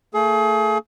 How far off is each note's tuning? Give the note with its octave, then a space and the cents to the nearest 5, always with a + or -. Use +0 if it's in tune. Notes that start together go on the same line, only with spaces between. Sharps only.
A3 +35 G#4 +35